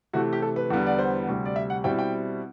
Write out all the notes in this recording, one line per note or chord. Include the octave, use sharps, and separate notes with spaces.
C3 E3 A3 F#4
G4
A4
B4
E2 D3 G3 B3
D5
C5
D2 C3 G3
D5
E5
F#5
B2 G3 C4 E4 G5
G5